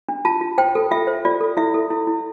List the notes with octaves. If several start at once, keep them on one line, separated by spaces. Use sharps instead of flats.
D4
F4 A5
F4
C5 G5
A4
F4 E5
C5
F4 D5
A4
E4 E5
A4
E4
E4